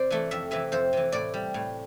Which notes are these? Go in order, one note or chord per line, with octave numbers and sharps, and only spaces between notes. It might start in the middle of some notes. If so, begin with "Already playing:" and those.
Already playing: C3 C5 D5
E3 A3
F2 E5
C3 E3 E5
F2 C5
C3 E3
A2 D5
G3
A2